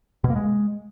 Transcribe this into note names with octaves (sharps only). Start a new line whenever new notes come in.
B2
A#3
G#3